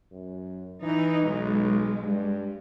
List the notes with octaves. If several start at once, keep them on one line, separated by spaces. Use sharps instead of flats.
F#2
E3 D#4
B1 G#3
G2